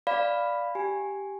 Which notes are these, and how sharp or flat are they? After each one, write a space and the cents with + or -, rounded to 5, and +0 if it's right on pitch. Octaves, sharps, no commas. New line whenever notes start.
D5 +0 F5 +0 B5 +0
G4 +0 G#5 +0